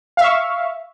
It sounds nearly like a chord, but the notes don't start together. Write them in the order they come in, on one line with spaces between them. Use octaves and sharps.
F5 E5 C#6